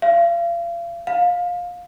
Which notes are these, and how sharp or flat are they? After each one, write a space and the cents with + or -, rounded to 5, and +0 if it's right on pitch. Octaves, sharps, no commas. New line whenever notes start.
F5 -35
F5 +20